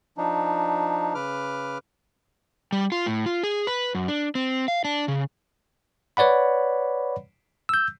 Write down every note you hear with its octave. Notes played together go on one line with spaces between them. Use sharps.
F3 D4 D#4
C#3 B4 D6 F6
G3
F4
A2
F4
G#4
B4
F#2
D4
C4
F5
D4
C#3
B4 C#5 D5 F#5 B5
E6 G6